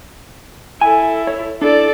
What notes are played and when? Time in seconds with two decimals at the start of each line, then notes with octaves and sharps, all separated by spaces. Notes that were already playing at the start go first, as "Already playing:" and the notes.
0.81 E4 A4 G#5
1.27 C#5
1.61 D4 E4 A4 D5